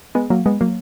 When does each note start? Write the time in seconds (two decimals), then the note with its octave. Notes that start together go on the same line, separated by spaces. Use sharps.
0.15 G#3 B3
0.30 F#3 A#3
0.46 G#3 B3
0.61 F#3 A#3